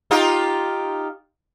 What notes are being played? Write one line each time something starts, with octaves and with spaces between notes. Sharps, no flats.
D#4 F4 G4